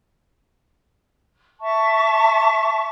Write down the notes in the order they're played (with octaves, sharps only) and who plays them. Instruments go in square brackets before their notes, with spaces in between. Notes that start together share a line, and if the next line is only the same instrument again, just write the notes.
[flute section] E5 A5 C#6